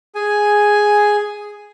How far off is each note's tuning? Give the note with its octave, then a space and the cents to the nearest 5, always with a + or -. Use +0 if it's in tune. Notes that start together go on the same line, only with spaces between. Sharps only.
G#4 +0 G#5 +5